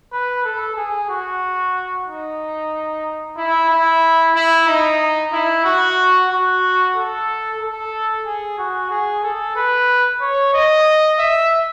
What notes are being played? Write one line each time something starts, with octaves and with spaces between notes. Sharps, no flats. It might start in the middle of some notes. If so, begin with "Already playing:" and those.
B4
A4
G#4
F#4
D#4
E4
E4
E4
D#4
E4
F#4
F#4
A4
A4
G#4
F#4
G#4
A4
B4
C#5
D#5
E5